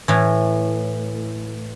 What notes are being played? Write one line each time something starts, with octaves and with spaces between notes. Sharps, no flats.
A2 E3